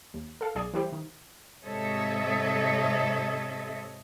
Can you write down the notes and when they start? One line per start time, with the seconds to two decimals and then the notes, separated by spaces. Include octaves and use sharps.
0.14 D#2
0.41 A4 F5
0.55 B1 G#4 D5 G#5
0.74 E3 G3 E4 G4 C5
0.92 D#3
1.63 G#2 C3 A4 C#5 D#5 E5